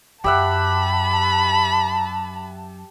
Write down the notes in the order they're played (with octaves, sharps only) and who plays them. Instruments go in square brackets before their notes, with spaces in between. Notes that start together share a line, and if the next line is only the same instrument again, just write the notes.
[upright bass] F#2 [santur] G4 E5 F#5 [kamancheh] A5 [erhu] B5